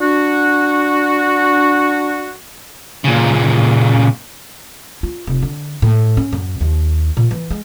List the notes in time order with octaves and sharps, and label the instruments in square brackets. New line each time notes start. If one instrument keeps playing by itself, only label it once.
[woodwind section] D4 F#4
[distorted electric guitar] A#2 C#3
[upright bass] F4
F1
D3
A2
C#4
F#2
D#2
A#2
E3
G#3